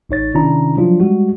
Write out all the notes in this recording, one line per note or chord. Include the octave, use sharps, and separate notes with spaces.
A1 D#4 C#5 A6
C3 D#3 C#4 D4 E4 A#5
F3 F#3 D4 F4
G3 G#3 F#4